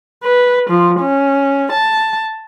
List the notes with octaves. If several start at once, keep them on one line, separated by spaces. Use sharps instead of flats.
B4
F3
C#4
A5